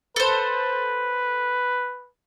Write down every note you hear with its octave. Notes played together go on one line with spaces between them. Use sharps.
A4 B4 C5